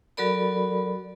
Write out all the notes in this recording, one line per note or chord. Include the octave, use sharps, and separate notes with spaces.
F#3 F#4 A4 A#4 D5 B5